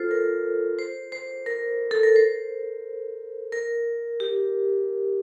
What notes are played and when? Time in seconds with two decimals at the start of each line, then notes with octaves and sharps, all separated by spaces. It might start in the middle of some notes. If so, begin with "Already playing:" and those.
Already playing: F4 A4 C5
0.11 A#4
0.79 C5
1.12 C5
1.46 A#4
1.91 A4
2.03 A#4
2.16 C5
3.52 A#4
4.20 G4